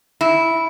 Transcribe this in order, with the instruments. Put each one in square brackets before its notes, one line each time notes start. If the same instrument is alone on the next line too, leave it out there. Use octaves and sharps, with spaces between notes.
[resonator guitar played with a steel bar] E4